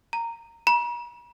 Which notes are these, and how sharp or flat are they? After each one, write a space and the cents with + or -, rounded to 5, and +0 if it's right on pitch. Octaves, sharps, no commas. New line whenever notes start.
A#5 -10
A#5 +45